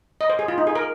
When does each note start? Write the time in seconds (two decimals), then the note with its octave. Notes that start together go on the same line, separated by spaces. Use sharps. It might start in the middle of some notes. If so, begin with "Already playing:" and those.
0.21 D#5
0.30 C5
0.39 G#4
0.48 F4
0.58 D#4
0.67 G#4
0.75 A#4